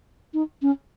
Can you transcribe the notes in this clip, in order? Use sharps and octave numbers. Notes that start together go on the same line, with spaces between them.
D#4
C#4